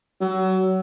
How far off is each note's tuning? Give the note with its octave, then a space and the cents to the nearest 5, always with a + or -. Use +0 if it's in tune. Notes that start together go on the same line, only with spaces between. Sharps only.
F#3 +25